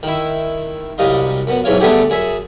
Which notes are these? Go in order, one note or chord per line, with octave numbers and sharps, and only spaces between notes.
D#3 E4
C2 F#2 G3 D#5 F5 C6
F#2 B3
B1 G#2 E3 C#5 F5
D3 G3 A3 B3 G4 G#4
F#2 G#4 E5